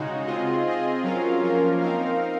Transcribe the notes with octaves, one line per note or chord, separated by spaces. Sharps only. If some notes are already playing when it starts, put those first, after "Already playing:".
Already playing: C#3 G#3 D#4 F#4
C4 F4 G#4 D#5
C4 F4 G#4 D#5
F#3 C#4 F4 A#4 F5
F3 A#3 C#4 F4 A#4
C4 D#4 A#4 F5